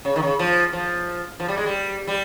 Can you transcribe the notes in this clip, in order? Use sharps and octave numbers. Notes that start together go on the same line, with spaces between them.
C#3
D#3
C#3
F3
F3
F3
G3
G#3
G3
G3